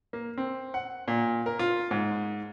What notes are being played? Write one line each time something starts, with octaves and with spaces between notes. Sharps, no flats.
A#3
C4
F#5
A#2
A#4
F4
G#2